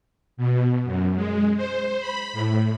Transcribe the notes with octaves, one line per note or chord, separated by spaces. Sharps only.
B2
F#2
G#3
C5
B5
A2